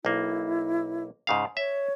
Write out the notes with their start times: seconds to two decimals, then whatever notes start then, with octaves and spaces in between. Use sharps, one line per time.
0.05 B1 A#3 E4
1.27 G#2 C#3 F5
1.57 C#5 E5